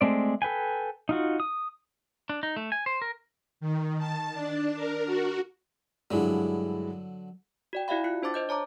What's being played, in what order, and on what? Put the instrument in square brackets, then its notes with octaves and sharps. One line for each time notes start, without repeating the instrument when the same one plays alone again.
[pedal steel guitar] G#3 A3 C4 D5
A4 B4 G5 G#5
D#4 F4 F#4
D#6
D4
D#4
A3
G#5
C5
A#4
[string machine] D#3
A5
D4
A#4
F#4
[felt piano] G2 G#3 E4 [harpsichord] D3 F#3
[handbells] F#4 D5 G5
E4 F#4 D5 E5 F5 B5
F4 F#6 C#7
D4 C5 A5 D6 A6
C5 D#5 G6
C#5 A5 A#5 D6